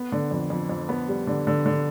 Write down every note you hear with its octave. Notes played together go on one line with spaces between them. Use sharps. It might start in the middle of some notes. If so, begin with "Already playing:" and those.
Already playing: B3
D3
F2
F2
F2
B3
G3
D3
D3
D3